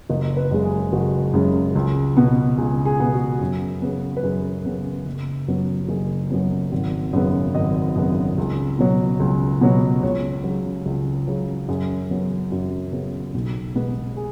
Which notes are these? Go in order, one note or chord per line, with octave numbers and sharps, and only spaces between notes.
F#1 D#5
B4
F#2 C#3 G#3
G#4
F#1 F#4
F#2 C#3 G#3
C#2
B2 B3
C#2 G#4
G#4
B2 B3
F#4
F#2
C#3 B3
B4
F#2 G#4
C#3 B3
F#1
F#2 F#3 B3
F#1 G#4
F#2 F#3 B3
G#1
F#2 C#3 B3
G#1 D#5
F#2 C#3 B3
C#2
B2 F#3 B3
C#2
B2 F#3 B3
C#2 C#5
C#3 F#3
C#2
C#3 F#3
F#2 G#4
C#3 F#3 B3
F#2 F#4
C#3 F#3 B3
B1
B2 G#3 B3
G#4